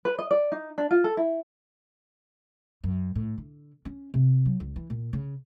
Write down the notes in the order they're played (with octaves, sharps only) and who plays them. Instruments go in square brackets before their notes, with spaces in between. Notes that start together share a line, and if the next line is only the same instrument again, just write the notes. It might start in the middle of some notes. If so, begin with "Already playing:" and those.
[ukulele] B4
D#5
D5
D#4
D4
F4
A4
E4
[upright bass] F#2
A2
D3
C#4
C3
F#3
C#2
E3
A#2
C#3